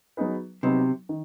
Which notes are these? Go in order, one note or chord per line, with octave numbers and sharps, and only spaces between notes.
F#3 B3 D#4 G#4 B4
C3 F#3 B3 D#4
D#3